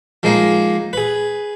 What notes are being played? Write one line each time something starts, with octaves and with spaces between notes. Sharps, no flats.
F3 G#3 A#3 D#4
G#4 B4